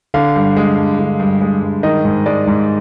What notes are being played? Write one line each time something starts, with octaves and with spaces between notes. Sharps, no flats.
D3 F5
G2
G#3
G2
D3
G2
G#3
G2
D#3 D#5
G#2
G#3 D5
G#2